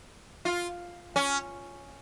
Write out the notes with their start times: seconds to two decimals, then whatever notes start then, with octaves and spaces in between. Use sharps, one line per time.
0.45 F4
1.16 C#4